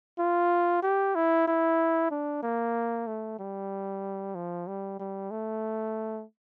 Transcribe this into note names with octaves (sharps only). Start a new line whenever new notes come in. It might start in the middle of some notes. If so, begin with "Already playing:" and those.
F4
G4
E4
E4
D4
A#3
A3
G3
F3
G3
G3
A3